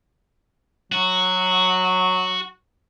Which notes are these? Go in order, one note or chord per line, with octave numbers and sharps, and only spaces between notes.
F#3 F#4